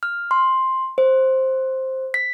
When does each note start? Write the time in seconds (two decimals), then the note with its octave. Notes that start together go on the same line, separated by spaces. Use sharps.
0.03 F6
0.31 C6
0.98 C5
2.14 B6